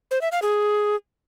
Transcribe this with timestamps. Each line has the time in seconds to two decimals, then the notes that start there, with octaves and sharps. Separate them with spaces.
0.11 C5
0.21 E5
0.32 F5
0.42 G#4